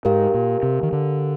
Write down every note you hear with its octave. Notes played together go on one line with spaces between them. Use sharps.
G#2 G4 A#4 F5
A#2
C3
D#3
D3